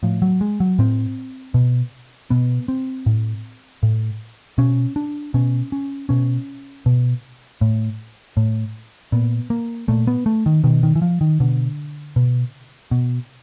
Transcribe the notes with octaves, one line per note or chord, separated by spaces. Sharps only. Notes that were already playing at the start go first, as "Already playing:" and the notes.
A2 F3
F#3
G#3
F#3
A2 C4
B2
B2 B3
C4
A2
A2
B2 C#4
D4
B2 C#4
C#4
B2 C#4
B2
A2
A2
A#2 B3
A#3
A#2 A3
B3
A3
D#3
B2 D#3
D#3
E3
F3
D#3
B2 D3
B2
B2